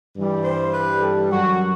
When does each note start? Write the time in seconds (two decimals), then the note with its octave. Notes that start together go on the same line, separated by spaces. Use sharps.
0.16 G2 E3 G3
0.44 C5
0.73 B4
1.02 A4
1.30 F#2 F#3 F#4